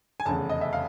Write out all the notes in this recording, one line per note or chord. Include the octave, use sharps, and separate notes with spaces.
G#5
F1 E2 C#3 A5
D#5
E5
F5